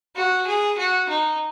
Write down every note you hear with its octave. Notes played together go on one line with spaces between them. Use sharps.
F#4
G#4
F#4
D#4